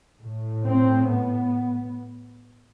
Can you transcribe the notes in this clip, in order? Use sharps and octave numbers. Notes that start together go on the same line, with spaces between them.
A2
C4
B3